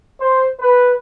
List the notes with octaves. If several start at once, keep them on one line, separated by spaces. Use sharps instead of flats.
C5
B4